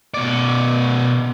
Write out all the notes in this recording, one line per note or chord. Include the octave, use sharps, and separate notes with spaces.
B2 D5